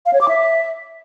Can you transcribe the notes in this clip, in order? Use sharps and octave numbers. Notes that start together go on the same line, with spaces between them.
F5
C#5
D6
E5